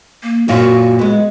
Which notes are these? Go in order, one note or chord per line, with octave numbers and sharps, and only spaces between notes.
A#3
F#2 A#2 F4 F#4
G#3 B3